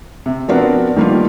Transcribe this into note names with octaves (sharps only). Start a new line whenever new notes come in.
C3
F3 B3 C4 D4 F#4 A#4
D#3 G3 A#3 D4 F4